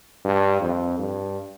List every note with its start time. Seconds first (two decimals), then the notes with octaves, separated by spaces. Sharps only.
0.25 G2
0.61 F2
0.99 G2